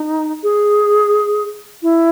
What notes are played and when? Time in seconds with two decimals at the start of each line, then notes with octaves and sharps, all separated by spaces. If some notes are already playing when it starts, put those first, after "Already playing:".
Already playing: D#4
0.43 G#4
1.82 E4